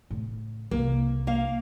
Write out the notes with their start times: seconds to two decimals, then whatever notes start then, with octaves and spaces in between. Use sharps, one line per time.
0.10 A2 C#3
0.71 C2 C#3 A#3
1.27 A#3 F5